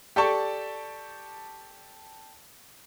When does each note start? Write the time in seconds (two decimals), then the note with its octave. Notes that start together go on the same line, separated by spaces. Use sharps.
0.16 G4 A4 D5 G5 A5 C#6